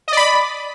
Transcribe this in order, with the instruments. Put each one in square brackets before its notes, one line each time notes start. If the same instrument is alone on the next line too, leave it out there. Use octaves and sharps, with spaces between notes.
[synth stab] D#5
D5
B5